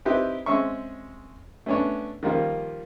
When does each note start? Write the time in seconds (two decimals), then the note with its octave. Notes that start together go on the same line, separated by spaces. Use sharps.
0.05 C4 D#4 E4 G4 B4 C5
0.46 G#3 C4 C#4 E5 C#6
1.66 A3 B3 C#4 D4 C#5
2.23 D#3 F3 G3 A#3 F4